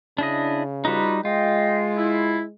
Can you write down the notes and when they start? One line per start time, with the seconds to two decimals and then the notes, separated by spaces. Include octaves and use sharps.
0.18 C#3 D4 E4 D#5
0.85 G3 D#4 F4 F#4 B4
1.25 G#3 F4 D#5 G5
1.97 E4